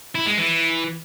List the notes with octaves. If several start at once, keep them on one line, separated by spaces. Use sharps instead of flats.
E4
G#3
E3